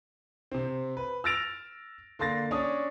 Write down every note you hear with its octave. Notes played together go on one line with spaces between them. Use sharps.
C3 C4
B4
E6 F6 A6 A#6 D7 F7
D3 A#3 C6 A6 A#6
C#4 D4 C#5 D#6